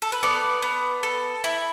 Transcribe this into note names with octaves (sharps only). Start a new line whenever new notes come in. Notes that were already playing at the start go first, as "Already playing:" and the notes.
A4
B4
B3 A4 D5
B3
A4
E4